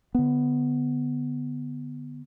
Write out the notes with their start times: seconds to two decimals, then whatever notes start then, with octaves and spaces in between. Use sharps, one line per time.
0.15 D3 B3